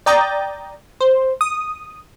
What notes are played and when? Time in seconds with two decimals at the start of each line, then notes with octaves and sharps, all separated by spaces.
0.06 D5 G5 A#5 D#6 G6 A6
1.01 C5
1.41 D#6